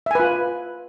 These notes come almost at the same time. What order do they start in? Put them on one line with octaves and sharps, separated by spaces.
E5 G#5 B4 F4